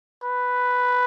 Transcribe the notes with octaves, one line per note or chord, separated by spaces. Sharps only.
B4